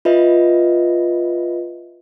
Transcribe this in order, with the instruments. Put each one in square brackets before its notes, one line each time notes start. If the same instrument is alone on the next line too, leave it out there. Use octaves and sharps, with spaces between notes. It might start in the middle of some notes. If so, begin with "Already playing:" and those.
[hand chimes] F4 B4 D#5 E5